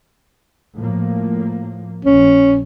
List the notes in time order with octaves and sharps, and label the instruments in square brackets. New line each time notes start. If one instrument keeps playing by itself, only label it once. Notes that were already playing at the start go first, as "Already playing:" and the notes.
[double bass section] A2 F3 A#3
[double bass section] A#1 [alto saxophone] C#4